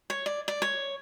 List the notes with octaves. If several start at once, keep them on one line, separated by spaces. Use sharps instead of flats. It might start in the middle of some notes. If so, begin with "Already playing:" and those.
C#5
D5
D5
C#5